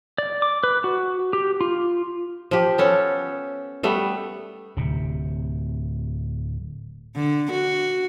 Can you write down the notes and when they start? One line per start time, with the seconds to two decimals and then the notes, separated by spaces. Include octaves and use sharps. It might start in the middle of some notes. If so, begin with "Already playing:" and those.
0.18 D5
0.42 D6
0.64 B4
0.84 F#4
1.33 G4
1.61 F4
2.51 F3 G4
2.78 B3 C#4 A4
3.83 G3 A3 B3
4.77 D1 C3
7.16 D3
7.51 F#4